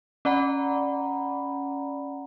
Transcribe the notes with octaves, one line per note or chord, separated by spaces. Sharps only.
C#4 D5 F#5 A#5 B5